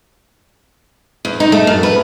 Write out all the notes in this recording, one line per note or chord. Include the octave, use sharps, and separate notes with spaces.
E2
D#4
A3
F#2
B4